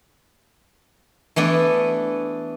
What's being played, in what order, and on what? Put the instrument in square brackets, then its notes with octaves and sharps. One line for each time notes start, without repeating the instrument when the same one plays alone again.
[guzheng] E3 A3 B3 D4